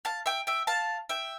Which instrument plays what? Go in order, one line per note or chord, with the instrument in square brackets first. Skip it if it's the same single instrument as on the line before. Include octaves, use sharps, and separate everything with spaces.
[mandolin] F5 A5
E5 G5
E5 G5
F5 A5
E5 G5